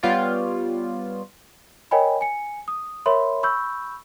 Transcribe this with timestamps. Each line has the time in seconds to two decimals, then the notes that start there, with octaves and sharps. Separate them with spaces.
0.03 G3 B3 F4 C#5 D5
1.91 A#4 C#5 D#5 G5 G#5 B5
2.21 G#5 C#7
2.68 D#6
3.06 A#4 C#5 E5 B5 C6
3.43 B5 C#6 E6 G6